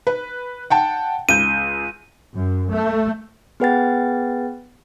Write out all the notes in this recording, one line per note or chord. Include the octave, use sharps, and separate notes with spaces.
B4
F#5 G5 A5
C#2 G6 D#7
F#2
A3
B3 G#4 B4 F#5 G5 A6